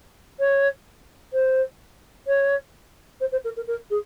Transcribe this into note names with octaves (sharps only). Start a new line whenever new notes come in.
C#5
C5
C#5
C5
C5
A#4
A#4
A#4
G#4